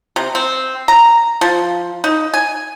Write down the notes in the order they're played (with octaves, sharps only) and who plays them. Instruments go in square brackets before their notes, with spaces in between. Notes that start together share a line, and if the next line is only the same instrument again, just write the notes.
[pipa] C3
C4
A#5
F3
D#4
G#5